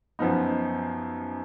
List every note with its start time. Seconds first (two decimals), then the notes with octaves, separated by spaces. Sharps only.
0.19 F#2 F3 B3 D#4